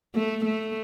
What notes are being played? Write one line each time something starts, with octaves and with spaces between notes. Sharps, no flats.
A3
A3